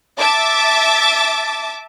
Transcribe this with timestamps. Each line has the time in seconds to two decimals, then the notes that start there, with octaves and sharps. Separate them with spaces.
0.18 E5 A5 D6 A6